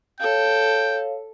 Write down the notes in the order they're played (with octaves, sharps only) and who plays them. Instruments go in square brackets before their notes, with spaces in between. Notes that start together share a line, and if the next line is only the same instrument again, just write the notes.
[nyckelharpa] A4 [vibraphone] C#5 F5 [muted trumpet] G5